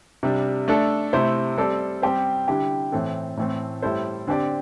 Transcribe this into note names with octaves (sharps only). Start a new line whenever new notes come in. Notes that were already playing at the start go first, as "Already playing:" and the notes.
C3 G3 D4
A3 D4 A4
C3 A3 E4 C5
G3 C4 A4 D5
G3 C4 G4 C5
D3 G3 E4 G4
A2 E3 C4 A4
A2 E3 A3 C4
A2 G3 E4 A4 C5
D3 C4 G4 D5